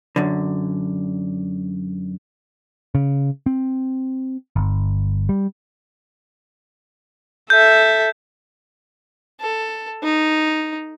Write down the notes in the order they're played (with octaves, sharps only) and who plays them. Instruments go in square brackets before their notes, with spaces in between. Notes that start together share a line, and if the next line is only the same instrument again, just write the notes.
[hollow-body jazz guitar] F#2 D3
[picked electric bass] C#3
C4
G1
G3
[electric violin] A4 E5 [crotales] G6
[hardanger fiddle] A4
D#4